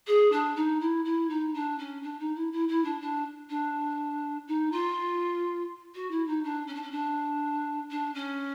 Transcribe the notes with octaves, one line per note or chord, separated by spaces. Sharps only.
G#4
D4
D#4
E4
E4
D#4
D4
C#4
D4
D#4
E4
E4
E4
D4
D4
D4
D#4
F4
F#4
E4
D#4
D4
C#4
D4
C#4
D4
D4
C#4